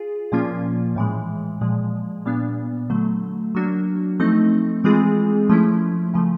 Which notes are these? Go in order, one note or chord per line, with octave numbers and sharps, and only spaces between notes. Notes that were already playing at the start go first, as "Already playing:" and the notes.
Already playing: F4 G#4
A#2 F3 A#3 C#4 F4
A2 E3 G#3
A#2 F3 G#3
A#2 G3 B3 D4
D3 F#3 A3
F#3 A#3 D4 F#4
F3 A3 C4 D#4
E3 G#3 C4 F4 G#4
F3 A3 C#4 E4
C#3 F3 A3